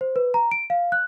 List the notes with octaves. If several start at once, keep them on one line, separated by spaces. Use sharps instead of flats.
C5
B4
A#5
D7
F5
F#6